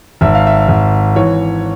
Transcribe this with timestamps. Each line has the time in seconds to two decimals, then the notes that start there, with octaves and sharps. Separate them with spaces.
0.21 G#1 E5
0.35 F5
0.47 E5
0.68 G#1
1.16 E3 C#5